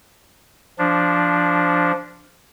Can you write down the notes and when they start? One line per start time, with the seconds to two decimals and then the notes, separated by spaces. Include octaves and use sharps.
0.79 F3 D4